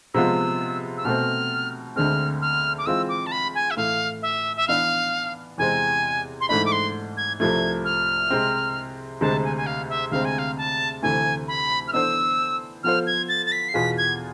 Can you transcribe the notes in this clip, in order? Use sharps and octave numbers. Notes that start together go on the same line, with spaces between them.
C3 F3 G#3 B3 F4 E6
E6
B2 A3 C4 F6
D2 D3 G#3 C4 F6
F6
D6
E3 G#3 C4 F4 E6
D6
A5
B5
G#5
E5
A2 E3 A3 F5
E5
E5
E3 B3 D4 F5
E2 C3 G#3 C4 G#5
C6
G#2 E3 A3 D4 B5
D6
C6
G#6
C2 C3 F3 A3 G#6
F6
C3 G#3 C4
D2 C3 G#3 A5
G#5
G#5
F5
E5
D2 C3 G#3 C4 F5
G#5
F5
A5
D2 C3 E3 A3 G#5
B5
F6
E3 B3 D4 A4 C5 E6
F3 B3 F4 A4 C5 F6
G#6
A6
A6
B6
C7
E2 B2 B3 F4 G#4 B6
G#6